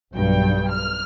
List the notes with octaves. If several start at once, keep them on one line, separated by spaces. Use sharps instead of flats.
B1 G2 G5
F6